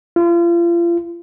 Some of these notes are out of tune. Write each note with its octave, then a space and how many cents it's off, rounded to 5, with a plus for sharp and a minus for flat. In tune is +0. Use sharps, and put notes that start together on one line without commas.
F4 -35